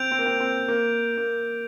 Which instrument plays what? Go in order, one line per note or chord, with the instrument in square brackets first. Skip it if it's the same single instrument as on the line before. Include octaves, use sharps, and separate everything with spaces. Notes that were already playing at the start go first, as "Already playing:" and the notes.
Already playing: [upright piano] C4 [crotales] G6 D7 F7
[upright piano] C4
A#3
C4
C4
A#3
A#3